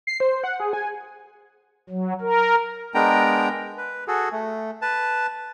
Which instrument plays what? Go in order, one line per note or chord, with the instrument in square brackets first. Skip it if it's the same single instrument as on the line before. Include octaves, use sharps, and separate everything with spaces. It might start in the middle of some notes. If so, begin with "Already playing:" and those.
[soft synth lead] C7
C5
F#5
G#4
G#5
[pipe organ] F#3
A#4
[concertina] G#3 B3 D4 A#4 G5 A#5
B4
F#4 G#4 A4
A3
B4 A5